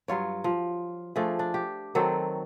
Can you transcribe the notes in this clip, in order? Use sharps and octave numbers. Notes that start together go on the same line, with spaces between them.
G2 F#3 F4 C#5
F3
F3 A3 D4 G#4
D4
G4
D#3 F#3 C4 A4